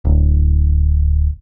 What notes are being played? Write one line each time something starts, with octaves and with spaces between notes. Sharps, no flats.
D1